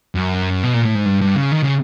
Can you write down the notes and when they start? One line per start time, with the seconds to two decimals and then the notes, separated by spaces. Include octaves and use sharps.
0.15 F#2
0.63 B2
0.74 A#2
0.85 A2
0.95 G#2
1.06 G2
1.21 G2
1.36 C#3
1.52 D#3
1.63 C#3